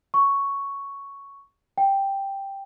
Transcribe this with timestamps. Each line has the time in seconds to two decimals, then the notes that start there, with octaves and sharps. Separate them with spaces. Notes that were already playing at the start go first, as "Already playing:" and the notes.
0.14 C#6
1.78 G5